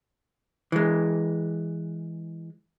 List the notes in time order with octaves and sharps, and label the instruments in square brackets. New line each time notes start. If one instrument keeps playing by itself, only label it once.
[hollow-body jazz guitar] E3 G#3